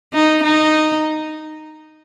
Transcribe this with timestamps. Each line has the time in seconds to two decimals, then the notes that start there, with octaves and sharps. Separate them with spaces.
0.14 D#4
0.43 D#4